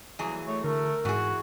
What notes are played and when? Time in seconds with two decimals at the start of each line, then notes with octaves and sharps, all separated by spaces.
0.19 G2 E3 F#3 G3 A#3 G#4
0.47 A3 C#5
0.64 D3 A3 A#4
1.05 G#2 E3 F#4 G#4